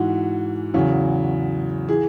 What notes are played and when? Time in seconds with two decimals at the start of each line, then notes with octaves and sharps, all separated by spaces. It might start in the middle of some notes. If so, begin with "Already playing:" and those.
Already playing: G#2 E3 F#4
0.74 E2 C#3 F#3
1.88 E3 G#4